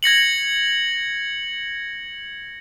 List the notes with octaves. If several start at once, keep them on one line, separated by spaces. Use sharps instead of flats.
G#6 A#6 C#7 F#7